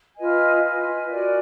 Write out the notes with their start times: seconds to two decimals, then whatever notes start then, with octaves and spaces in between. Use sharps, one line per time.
0.16 F4 B4 D#5 G#5
0.62 F4 B4 D#5 G#5
1.09 F#4 A#4 D5 G#5